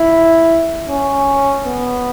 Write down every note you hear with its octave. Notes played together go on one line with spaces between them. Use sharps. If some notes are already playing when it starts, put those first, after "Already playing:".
Already playing: E4
C#4
B3